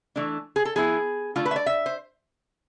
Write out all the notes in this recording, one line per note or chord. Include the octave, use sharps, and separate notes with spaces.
E3 A3 D4
G#4
A4
F3 B3 E4 G#4
D3 A3 D4 F4
B4
E5
D5
E5
C5